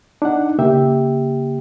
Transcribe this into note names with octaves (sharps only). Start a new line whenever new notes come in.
D4 D#4 F#5
C#3 A#3 G4 E5 G5